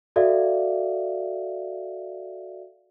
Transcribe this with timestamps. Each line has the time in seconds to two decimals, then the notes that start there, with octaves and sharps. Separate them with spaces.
0.16 F#4 A4 D5 E5 F5